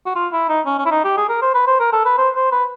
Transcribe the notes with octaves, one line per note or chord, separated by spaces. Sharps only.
F#4
F4
E4
D#4
C#4
C#4
E4
D#4
G4
G#4
A#4
C5
B4
C5
A#4
A4
B4
C5
C5
B4